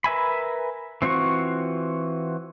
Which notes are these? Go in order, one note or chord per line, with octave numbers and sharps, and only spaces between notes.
A#4 B4 E5 G#5 B5
E3 C4 F4 F#4 C#6